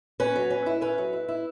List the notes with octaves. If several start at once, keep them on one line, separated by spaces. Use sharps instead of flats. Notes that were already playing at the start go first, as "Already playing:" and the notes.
C#4 B4
F#3
C#4
E4
C#4 B4
F#3
E4
E4